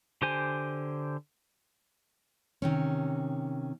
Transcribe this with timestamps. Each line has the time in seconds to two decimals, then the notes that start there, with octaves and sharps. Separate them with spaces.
0.22 D3 G4 C5 G#5
2.62 C3 D#3 C#4